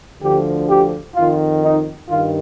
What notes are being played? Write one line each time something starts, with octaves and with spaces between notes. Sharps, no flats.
D2 D3 F3 G4
G4
F2 D#3 F4
D#4
G2 D#3 F4